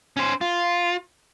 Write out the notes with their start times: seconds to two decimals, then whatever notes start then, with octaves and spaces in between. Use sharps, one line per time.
0.17 C#4 C5
0.41 F4